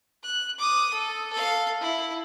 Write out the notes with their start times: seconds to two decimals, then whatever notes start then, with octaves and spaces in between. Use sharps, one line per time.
0.23 F#6
0.58 D6 D#6
0.93 A4
1.32 A4 F5
1.80 E4